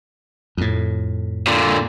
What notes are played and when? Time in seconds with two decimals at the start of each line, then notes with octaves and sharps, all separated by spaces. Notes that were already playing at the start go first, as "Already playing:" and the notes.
0.57 F2 A2
1.47 A#2 D3